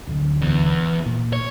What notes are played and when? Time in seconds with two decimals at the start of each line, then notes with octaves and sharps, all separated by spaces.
0.07 D1 D3
0.42 E2 E3
1.06 A#2
1.33 C#5